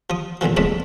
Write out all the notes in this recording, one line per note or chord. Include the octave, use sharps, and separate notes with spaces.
F3 D#6
A#1 E2 D3 E3 F3
B1 F2 G#2 A3 D#5 B5